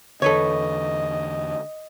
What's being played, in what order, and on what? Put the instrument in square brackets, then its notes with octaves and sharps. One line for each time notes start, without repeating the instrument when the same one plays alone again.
[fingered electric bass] E2 D3 [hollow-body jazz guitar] A4 B4 C#5 [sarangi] D#5